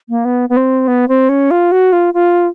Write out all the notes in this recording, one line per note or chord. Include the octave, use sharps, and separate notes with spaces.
A#3
B3
B3
C4
B3
C4
C#4
F4
F#4
F4
F4